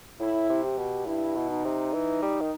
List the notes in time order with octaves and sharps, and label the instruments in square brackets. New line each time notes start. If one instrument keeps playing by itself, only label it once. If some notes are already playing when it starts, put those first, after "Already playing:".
[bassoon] A2 [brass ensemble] E4
[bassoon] C3
[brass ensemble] G4
[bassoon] B2
[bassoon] G2 [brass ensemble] E4
[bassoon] B2
[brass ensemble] D#4
[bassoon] C3
E3
G3
D#3